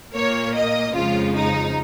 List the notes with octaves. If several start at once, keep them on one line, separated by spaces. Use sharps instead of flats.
A#2 A#3 C#5
D#5
F2 C#3 F3 G#3 F4
D#4